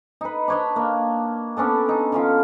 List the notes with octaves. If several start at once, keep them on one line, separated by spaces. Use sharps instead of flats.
D#4 B4
D4 C#5 D#5
A#3
B3 C#4 D4 A4
D#4
D3 C#4 F4